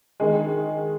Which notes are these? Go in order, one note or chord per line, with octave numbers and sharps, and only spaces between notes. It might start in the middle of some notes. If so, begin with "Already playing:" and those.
D#3 G#3